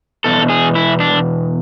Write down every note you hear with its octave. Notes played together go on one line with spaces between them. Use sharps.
E2 B2 A4
G#4
E4
D4